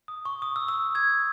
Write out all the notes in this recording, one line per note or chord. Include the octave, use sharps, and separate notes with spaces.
D#6
C#6
D#6
E6
E6
E6 G#6